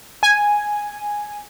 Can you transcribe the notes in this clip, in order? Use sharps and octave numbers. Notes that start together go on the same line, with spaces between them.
G#5